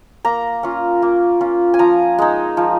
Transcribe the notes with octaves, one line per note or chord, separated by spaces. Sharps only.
A#3 A#5
C#4 F4
A#3
C#4 F4
G#5
F3 A#5
G#3 D#4
F3